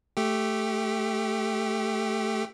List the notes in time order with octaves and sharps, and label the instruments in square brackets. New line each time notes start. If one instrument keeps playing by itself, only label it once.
[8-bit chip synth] A3 G4